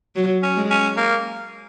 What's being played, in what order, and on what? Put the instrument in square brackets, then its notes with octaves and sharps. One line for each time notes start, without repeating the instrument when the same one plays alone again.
[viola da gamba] F#3
[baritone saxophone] C#4
[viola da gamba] G#3
[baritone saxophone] C#4
A#3